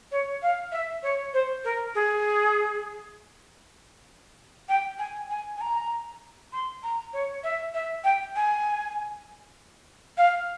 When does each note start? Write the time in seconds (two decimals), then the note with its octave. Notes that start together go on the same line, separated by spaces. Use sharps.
0.12 C#5
0.42 F5
0.72 E5
1.03 C#5
1.34 C5
1.65 A#4
1.95 G#4
4.69 G5
4.99 G#5
5.30 G#5
5.57 G#5
5.61 A#5
6.53 C6
6.83 A#5
7.13 C#5
7.44 E5
7.74 E5
8.04 G5
8.36 G#5
10.17 F5